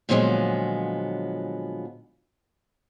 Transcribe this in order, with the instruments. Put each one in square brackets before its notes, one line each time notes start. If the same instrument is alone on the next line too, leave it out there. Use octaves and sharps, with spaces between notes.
[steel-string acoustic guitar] A#2 D3 F3 F#3 G#3 B3